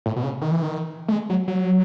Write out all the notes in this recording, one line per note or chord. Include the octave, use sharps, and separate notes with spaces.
A2
B2
C#3
D#3
E3
D#3
A3
G#3
F#3
F#3